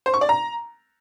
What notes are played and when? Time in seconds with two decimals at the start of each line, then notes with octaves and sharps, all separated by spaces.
0.06 C5
0.14 C#6
0.21 D5
0.29 A#5